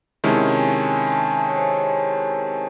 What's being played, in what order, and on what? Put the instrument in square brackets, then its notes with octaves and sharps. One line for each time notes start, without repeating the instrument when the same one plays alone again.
[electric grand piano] C3 D#3 G#3 C#4 E4 [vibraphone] A5
[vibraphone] G#5
G#5
A5
C#5
C5